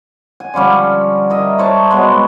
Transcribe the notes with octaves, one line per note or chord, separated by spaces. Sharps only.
G#5
D3 F3 G3 C#4
A#4 D#5 E5
C5 C#5 A5 A#5
B2 F#3 G#3